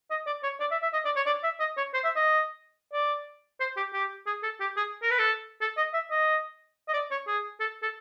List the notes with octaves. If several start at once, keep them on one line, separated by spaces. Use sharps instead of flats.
D#5
D5
C#5
D5
E5
E5
D#5
D5
C#5
D5
E5
D#5
C#5
C5
E5
D#5
D5
C5
G4
G4
G#4
A4
G4
G#4
A#4
B4
A4
A4
D#5
E5
D#5
D#5
D5
C#5
G#4
A4
A4